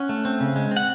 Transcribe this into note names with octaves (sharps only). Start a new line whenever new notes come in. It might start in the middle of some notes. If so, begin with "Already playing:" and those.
Already playing: C#4 F#5
A3
C4
C#3
G#3
C4
F#5